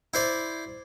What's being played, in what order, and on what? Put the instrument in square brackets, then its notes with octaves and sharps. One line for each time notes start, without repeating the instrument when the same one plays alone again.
[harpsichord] E4 C5 D5